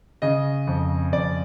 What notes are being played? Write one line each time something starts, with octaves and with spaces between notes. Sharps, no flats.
C#3 D#5
F2
F2 D5